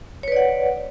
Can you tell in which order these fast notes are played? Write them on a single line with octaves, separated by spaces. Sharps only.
C#5 B4 D5 F#5